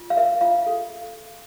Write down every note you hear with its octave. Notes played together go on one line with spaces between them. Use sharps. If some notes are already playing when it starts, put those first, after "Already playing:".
Already playing: F4
F5
A#4 E5
F4 F5
A4